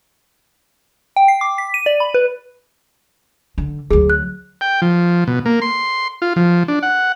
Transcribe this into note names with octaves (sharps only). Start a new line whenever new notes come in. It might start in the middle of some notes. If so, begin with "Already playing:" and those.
G5
C7
D6
B6
D#7
D5
B5
B4
D3
D2 F#3 G#4
F#6
G5
F3
B2
A#3
C6
F4
F3
D4
F#5